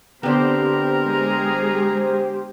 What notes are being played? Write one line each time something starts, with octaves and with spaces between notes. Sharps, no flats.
D3 B3 C4 G4 A#4 C5
G#3 G#4